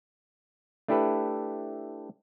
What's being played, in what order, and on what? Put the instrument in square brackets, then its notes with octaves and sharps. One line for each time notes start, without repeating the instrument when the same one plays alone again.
[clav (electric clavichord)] A3 D4 E4 G4 A4 B4